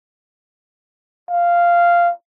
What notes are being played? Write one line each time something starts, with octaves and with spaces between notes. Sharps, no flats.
F5